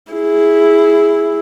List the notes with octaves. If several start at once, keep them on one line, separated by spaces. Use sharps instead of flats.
E4 G#4